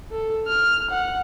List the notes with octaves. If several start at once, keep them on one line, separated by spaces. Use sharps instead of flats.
A4
F6
F#5